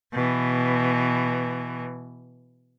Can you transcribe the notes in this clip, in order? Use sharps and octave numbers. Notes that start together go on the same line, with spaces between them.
B2 E3